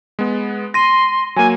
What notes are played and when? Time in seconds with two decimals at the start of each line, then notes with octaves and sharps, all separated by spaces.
0.19 G#3 B3
0.74 C6 A#6 D#7
1.36 F#3 A#3 G#5